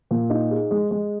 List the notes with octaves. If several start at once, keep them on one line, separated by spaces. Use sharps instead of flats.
A#2
D#4
G#4
G#3
G#3